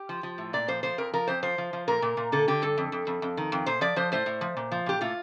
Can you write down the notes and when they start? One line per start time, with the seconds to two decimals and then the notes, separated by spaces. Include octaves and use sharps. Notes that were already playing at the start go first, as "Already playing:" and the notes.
Already playing: G4
0.09 F3
0.23 F3
0.38 A2
0.53 A#2 D5
0.68 F3 C5
0.83 F3 C5
0.98 F2 A#4
1.13 F3 A#4
1.27 F2 C5
1.42 F3 C5
1.58 F3
1.73 F3
1.88 A#2 A#4
2.02 A#2
2.17 A#2
2.32 D3 A4
2.48 D3 G4
2.62 G2 A4
2.78 F2
2.92 F2
3.07 F2
3.22 F2
3.37 D#3
3.52 F2
3.66 A#2 C5
3.81 F3 D5
3.96 F3 C5
4.12 A2 C5
4.26 A2
4.41 F3
4.57 A#2
4.71 F3
4.86 A#2 G4
5.01 A2 F4